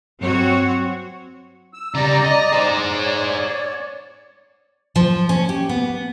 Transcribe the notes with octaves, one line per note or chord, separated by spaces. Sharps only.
G2 F#3 C4 F#4 C#5
E6
C#3 G3 D5 A#5
D#5
G#4 C5
C#5 D5
F3
C#4
G4
B3